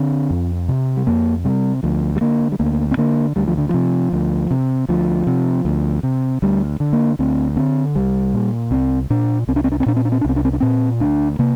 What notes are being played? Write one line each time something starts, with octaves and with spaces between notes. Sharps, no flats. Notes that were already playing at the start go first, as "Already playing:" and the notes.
Already playing: D3 C4
F2
C3
G3
F2 A#3
C3 G3
D2 F3
G3
D3 A#3
G3
D2 A#3
C4
D3 A#3
D2 G3
F3
D3
C3 F3
D2
C3
D2 F3
C3
D2
C3
D2 G3
D3
A#3
D2 C4
D3 C4
C2 G3
A#2
C2 C4
A#2 D4
C2 C4
D4
C4
D4
C4
A#2 D4
C4
D4
C4
D4
C2 C4
D4
C4
D4
A#2 C4
D2 D4
C3 A#3